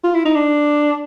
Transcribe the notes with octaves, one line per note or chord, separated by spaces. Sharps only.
F4
E4
D#4
D4